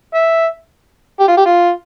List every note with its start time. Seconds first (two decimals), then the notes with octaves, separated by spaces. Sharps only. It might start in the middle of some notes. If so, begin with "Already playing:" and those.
0.15 E5
1.20 G4
1.28 F4
1.37 G4
1.46 F4